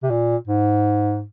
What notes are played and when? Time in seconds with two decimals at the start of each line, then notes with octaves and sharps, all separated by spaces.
0.03 C3
0.11 A#2
0.47 G#2